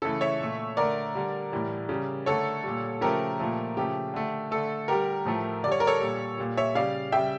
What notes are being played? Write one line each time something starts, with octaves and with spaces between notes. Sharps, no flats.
C#3 E3 A3 A4
C#5 E5
A#2 A3
D3 A3 A#4 D5
D3 G3
A2 E3 G3
C#3 G3
D3 A3 A4 C#5
A#2 G3
C#3 F3 A3 G4 A#4
A#2 F3 A3
C#3 F3 A3 G4
D3 A3
D3 A3 A4
D3 G3 G4 A#4
A2 F3 A3
D3 G3 C#5 D5
A#4
A4 C#5
A#2 G3
A#2 G3
C#5 E5
C#3 G3 D5 F5
C#3 G3 E5 G5